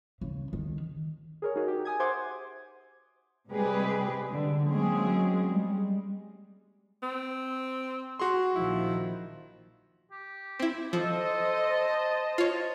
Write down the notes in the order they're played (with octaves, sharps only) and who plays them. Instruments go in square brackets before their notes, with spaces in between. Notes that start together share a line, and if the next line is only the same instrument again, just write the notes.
[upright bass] C#3
D#3
[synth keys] G#4 A#4 C#5
D#4 F#4 G#4 C#5
G4
G#5 D#6 G#6
C5 E5 F#5 C6 D6 G#6
[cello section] C3 G3 G#3 G4 G#4 B4
D3
F#3 G#3 A#3 C4 C#4 G#4
G3 G#3
[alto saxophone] C4
[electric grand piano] F#4 C6 [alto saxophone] G#4
[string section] A#1 D#3 F3 [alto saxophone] E4
[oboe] G4
[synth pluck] C4 E4
[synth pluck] F3 [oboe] A4 [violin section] C5 D#5
[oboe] A5
[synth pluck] F4 C#5